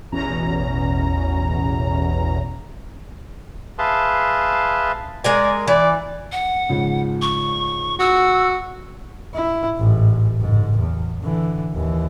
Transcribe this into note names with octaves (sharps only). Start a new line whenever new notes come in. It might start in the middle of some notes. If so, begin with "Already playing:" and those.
A1 E2 B2 C#4 A#5
G#4 B4 E5 F5 A5 C6
G#3 A#4 D5 G#5
E3 D5
F#5
G#2 C#3 F3
C#6
F#4 E6
E4
A1 G#2
F#1 G#2
E2
D3 E3
D#2 E3